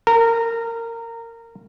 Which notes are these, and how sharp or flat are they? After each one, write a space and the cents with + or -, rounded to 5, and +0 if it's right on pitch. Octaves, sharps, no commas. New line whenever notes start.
A#4 -20